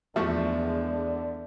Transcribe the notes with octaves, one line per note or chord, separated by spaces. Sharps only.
E2 D3 F3 G#3 A3 E5 C#6